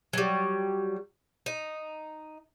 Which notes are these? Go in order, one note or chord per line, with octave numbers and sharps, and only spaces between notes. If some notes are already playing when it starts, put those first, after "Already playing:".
F#3 G3
D#4